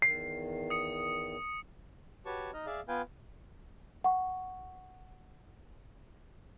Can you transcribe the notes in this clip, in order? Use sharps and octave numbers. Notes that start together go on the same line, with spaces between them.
E2 D#3 C7
D#6 C#7
F#4 G4 B4 C#5 A5 C#6
D#4 D#5 F6
G#4 D5 E5 F5
B3 F4 B4 F5 G5 G#5
F#5 C#6